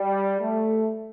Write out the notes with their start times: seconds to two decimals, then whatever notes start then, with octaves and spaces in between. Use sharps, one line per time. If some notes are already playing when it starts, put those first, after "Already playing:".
Already playing: G3
0.41 A3